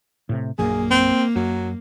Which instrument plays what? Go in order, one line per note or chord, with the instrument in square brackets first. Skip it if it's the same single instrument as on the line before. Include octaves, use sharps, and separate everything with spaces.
[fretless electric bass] A2 C3
[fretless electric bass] A#1 F#2 A#2 [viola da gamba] A#3 [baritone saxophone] G#4
[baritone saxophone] C4
[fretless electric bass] F#2 [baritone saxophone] F#3